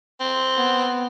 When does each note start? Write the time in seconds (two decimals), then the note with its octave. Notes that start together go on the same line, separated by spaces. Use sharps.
0.20 C4
0.57 B3